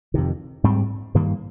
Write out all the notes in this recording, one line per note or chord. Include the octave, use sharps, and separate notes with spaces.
F2 C3 D#3
G#2 G3 C4
G2 D#3 G3 A#3